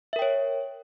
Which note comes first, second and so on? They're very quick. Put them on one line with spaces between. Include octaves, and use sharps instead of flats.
E5 A#4 G5 C#5